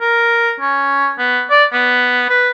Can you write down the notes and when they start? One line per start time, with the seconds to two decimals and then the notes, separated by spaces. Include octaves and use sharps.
0.01 A#4
0.60 C#4
1.18 B3
1.50 D5
1.73 B3
2.30 B4